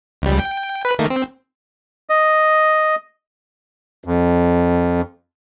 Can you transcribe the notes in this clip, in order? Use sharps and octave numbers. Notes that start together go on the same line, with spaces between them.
C#2 G3
G5
B4 F#6
D#3 A3 A#3
C4
D#5
F2